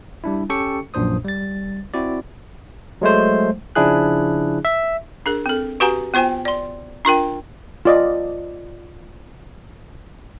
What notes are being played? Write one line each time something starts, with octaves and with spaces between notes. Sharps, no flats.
G3 D4 E4
C#4 G4 A4 G5 C#6 C#7
A#1 F#2 A#2 D4 C5 D#6
G3 A6
C4 E4 F#4 D5
F#3 G#3 A3 C5
C#3 F3 D4 E4 G#4 F#6
E5
D4 G#4 A#4
C4 A4
F#4 G4 B4 F#5 G#5 A#5
B3 F4 C5 G5 G#5
D5 C6
D4 F4 A#4 G5
F4 D5 D#5